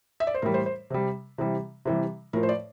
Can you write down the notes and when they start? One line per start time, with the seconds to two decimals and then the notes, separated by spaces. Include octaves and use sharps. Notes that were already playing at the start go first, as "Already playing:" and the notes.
0.20 E5
0.27 D5
0.34 C5
0.42 A2 E3 G3 A#4
0.54 C5
0.66 C5
0.90 C3 G3
1.38 C3 E3 G3
1.85 C3 E3 G3
2.33 A2 F3 A#4
2.43 C5
2.49 D5